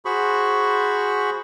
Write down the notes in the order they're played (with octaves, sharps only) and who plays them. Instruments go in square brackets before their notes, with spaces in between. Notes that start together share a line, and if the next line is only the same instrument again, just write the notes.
[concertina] F#4 G#4 C5 B5 C#6